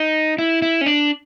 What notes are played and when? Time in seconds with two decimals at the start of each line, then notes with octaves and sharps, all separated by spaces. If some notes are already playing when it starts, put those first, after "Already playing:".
Already playing: D#4
0.38 E4
0.62 E4
0.81 C#4
0.86 D4